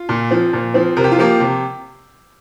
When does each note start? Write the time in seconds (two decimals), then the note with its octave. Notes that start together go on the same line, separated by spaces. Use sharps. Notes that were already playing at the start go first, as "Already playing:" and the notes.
Already playing: F4
0.09 A#2
0.31 F3 C4
0.53 A#2
0.74 F3 C4
0.97 C3 A#4
1.04 G4
1.12 F4
1.18 F3 A#3 G4
1.40 C3